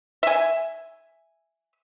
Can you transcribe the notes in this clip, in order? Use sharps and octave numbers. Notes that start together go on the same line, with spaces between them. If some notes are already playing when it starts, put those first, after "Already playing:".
E5 G#5